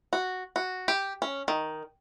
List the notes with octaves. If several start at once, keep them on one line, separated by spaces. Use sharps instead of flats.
F#4
F#4
G4
C#4
D#3